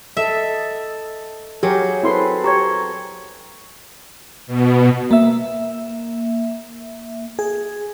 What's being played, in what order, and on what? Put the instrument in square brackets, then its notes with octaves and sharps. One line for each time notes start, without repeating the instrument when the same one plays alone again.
[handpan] A4 D#5 [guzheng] E5
[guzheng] F#3 [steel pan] G4 A#4 [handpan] G#4
[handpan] C4 A4 B4 [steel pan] E4 C6
[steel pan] G4 C#5 [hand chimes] A#5 C#6 G#6
[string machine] B2
[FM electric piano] A#3 E5
G#4